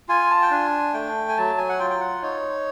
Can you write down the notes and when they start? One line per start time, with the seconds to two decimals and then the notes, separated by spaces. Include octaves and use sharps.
0.09 F4 G#5
0.31 A5
0.42 G5
0.51 D4 G#5
0.93 A3 G5
1.29 G#5
1.37 F#3 A5
1.58 G#5
1.69 F#5
1.79 F4 G5
1.90 G5
2.00 F#5
2.22 D#4 C#5